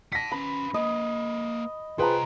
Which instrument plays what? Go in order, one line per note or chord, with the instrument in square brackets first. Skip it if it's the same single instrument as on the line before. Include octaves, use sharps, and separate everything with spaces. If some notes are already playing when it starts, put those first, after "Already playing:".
[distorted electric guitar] F#5 A5 [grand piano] A#6 B6
[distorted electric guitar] C#4 B4 [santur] B5
[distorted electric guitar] A#3 B4 [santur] D#5
[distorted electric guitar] C2 G5 [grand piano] F4 G#4 B4 [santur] C5 A#5